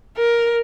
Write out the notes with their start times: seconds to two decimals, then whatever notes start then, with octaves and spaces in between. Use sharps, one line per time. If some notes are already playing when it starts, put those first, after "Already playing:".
0.18 A#4